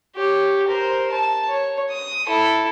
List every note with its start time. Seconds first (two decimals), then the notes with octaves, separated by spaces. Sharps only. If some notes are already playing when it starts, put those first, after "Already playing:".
0.16 G4 C#5
0.68 A#4 C5
1.12 A5
1.49 C#5
1.90 D#6
2.27 E4 A4